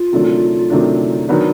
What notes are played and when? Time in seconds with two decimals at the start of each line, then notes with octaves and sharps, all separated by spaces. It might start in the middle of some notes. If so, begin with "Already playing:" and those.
Already playing: F4
0.12 C3 D#3 F#3 A3 D4
0.70 C3 D#3 F#3 A3 D4
1.29 D#3 F#3 B3 D4